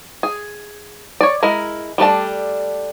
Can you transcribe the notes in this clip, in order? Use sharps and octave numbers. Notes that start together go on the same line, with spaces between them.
G#4
C#5 D5
G#3 E4 A#4
G3 A3 D4 A5